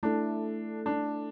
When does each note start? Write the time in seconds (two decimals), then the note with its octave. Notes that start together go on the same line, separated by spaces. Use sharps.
0.03 A3 D4 E4 A4
0.86 D4